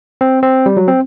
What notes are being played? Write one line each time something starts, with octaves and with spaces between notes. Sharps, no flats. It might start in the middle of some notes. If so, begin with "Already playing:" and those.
C4
C4
G3
F#3
C4